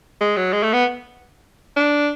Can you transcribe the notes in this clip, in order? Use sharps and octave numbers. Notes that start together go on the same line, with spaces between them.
G#3
F#3
G#3
A3
B3
D4